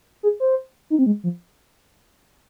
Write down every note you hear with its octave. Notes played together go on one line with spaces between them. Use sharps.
G#4
C5
D#4
C4
G#3
F3